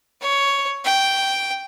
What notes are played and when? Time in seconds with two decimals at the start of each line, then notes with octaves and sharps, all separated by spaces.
0.22 C#5
0.85 G5